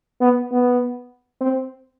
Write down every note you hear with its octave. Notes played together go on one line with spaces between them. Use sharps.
B3
B3
C4